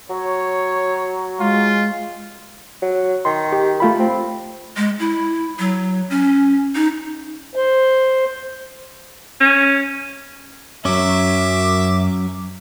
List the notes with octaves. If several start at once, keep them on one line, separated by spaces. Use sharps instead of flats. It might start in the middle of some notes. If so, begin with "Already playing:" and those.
F#3 C#5
G#3 F4
F#3
D#3 C6
G4
A3 F4 B5
C4
G#3
E4
F#3
C#4
D#4
C5
C#4
F#2 F#3 C#4 E5 D6